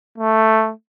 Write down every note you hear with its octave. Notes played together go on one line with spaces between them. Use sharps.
A3